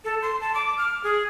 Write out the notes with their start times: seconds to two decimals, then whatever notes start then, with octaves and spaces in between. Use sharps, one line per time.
0.05 A4
0.22 C6
0.41 A5
0.55 D6
0.78 F6
1.04 G#4